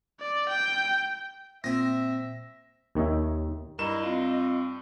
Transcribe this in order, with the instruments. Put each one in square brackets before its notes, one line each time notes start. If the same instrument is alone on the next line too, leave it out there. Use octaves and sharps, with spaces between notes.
[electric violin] D5
G5
[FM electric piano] A#2 [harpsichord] C4 D#6 [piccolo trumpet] E5 [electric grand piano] A#6
[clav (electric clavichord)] D#2 D#3 C#5 D#5 E5
[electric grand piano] G2 E7 [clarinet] E4 [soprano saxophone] A#4 [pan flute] D#5
[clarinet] C4 [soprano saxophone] F4